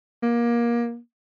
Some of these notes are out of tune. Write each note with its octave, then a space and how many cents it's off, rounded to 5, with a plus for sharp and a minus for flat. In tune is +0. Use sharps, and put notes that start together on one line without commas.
A#3 +25